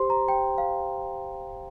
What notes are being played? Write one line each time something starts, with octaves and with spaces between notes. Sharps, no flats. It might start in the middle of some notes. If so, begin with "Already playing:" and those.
Already playing: G4 C5 C6
A#5
G5
F5